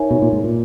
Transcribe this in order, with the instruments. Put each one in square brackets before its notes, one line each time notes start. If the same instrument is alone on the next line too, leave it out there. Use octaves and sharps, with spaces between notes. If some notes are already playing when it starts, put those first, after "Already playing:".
Already playing: [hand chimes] D#4 A#4 C#5 E5 G#5
[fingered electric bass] B2
A#2
G#2
A#2